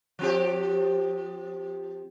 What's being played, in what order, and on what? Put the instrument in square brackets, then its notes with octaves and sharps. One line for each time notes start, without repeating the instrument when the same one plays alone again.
[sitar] F3 C4 G4